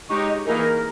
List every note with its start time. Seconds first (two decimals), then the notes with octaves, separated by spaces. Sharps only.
0.10 G#3 D#4 G4 C#5 C#6
0.28 D#5
0.46 E3 A#3 D#4 G#4 A#4